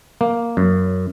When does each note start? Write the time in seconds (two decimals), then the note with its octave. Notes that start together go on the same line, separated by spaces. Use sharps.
0.21 A#3
0.57 F#2